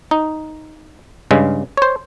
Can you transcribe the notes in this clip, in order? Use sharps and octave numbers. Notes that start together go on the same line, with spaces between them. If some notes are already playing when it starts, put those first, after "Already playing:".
D#4
G2 C#3 G#3
C5 C#5